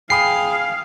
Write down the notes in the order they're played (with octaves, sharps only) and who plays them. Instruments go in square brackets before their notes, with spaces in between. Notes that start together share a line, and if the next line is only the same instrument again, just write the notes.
[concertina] G#4 [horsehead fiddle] F5 [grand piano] G5 B5 D#6 [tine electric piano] C7